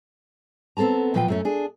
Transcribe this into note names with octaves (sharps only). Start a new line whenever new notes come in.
B3 C4 A4 A5 A#5
A#2 F3 F#3 B4 D5 G5
F#2 A3 C#4
D4 G#4